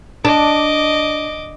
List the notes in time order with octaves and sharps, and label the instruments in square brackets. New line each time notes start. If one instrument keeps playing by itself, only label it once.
[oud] D4 [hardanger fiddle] D#5 D6